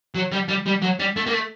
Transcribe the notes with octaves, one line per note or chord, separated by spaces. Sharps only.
F#3
G3
G3
G3
F#3
G3
A3
A#3
A3